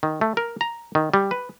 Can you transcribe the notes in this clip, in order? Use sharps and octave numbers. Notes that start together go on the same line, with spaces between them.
D#3
A3
A#4
A#5
D#3
G3
B4